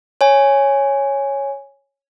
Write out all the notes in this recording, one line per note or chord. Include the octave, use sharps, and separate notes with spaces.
C#5 G#5